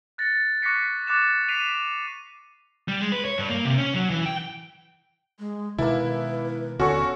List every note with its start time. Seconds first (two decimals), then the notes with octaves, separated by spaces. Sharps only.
0.18 F#6 A6 A#6 C#7
0.62 C#6 D6 F#6 A#6 B6 C#7
1.07 C#6 D6 F#6 A6 E7
1.49 B6 C7 D7 D#7 F7
2.88 G3
3.00 G#3
3.12 B4
3.25 C#5
3.38 G2
3.50 A#3
3.65 C3
3.78 C#4
3.95 F#3
4.10 E3
4.26 G5
5.39 G#3
5.78 B2 D#3 G#3 A#3 E4 B4 A5
6.80 D#1 D3 B3 C#4 F#4 A4 C#5 C#6